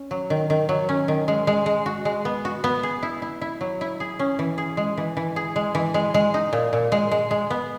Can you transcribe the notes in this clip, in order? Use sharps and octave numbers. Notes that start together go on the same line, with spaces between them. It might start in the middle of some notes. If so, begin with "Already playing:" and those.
Already playing: C#4
F#3
D#3
D#3
F#3
C#4
D#3
G#3
G#3
G#3
F#4
G#3
B3
F#4
B3
G#4
E4
E4
E4
F#3
E4
G#4
C#4
E3
G#4
G#3
E3
E3
G#4
G#3
E3
G#3
G#3
D#4
A#2
A#2
G#3
G#3
G#3
B3